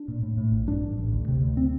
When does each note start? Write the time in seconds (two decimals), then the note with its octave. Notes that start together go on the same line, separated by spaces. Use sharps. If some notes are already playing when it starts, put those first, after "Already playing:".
Already playing: D4
0.08 A#2
0.23 A2
0.37 A2
0.52 A#1
0.67 G2 D4
0.82 A1
0.98 A1
1.12 D2
1.28 C3
1.42 D2
1.57 C4